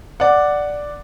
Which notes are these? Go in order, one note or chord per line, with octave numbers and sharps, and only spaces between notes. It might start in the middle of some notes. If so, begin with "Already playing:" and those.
D5 F#5